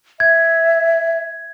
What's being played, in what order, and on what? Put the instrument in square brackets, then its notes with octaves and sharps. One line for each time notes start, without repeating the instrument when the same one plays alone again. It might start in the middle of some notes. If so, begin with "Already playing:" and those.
[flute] E5 [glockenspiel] G#6